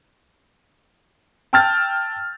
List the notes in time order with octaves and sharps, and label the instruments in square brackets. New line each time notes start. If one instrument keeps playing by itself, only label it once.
[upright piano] G5 A5 E6 F6 G6 A6